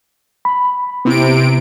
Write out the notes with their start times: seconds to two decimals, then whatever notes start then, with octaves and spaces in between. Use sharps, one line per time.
0.45 B5
1.05 C3 B3 E4 D7